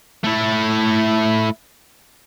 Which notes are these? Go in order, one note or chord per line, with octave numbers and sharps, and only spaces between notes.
A3 E4